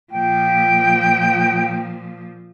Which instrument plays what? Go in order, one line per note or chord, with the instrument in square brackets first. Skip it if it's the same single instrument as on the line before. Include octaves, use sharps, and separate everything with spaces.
[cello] A#2 F3 [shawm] G5